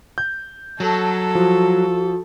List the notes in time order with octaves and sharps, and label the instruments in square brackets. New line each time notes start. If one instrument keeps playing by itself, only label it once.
[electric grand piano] G6
[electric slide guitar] F#3 [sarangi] A4 [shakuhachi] A5
[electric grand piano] F3 [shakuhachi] F#4